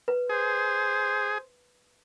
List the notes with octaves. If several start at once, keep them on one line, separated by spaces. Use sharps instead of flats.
B4
G#4 C5